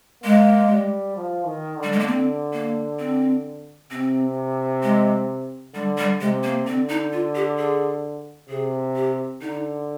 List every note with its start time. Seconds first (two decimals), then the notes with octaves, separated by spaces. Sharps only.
0.23 G#3 A#3
0.70 G3
1.16 F3
1.46 D#3
1.77 D3
1.83 G3
1.92 G#3
1.99 A#3
2.07 D3 C4
2.53 A#3
2.99 C4
3.91 C3 C4
4.83 G#3
5.74 D3 G3
5.98 G3
6.21 C3 G#3
6.43 A#3
6.66 D3 C4
6.89 D#4
7.13 F4
7.35 G4
7.58 G#4
8.49 C3 G#4
8.96 G4
9.41 D3 D#4